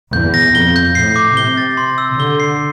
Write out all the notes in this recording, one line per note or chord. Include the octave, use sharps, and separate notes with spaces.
E2 G6
A#6
F2 G7
G6
A2 C7
D6
C3 G7
A6
C6
E6
D3 G7
C7